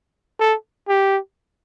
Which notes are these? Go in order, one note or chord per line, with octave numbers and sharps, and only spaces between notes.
A4
G4